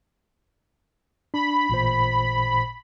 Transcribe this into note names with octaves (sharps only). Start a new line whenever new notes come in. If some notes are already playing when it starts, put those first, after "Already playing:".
D4 B5
A1 A#2 C5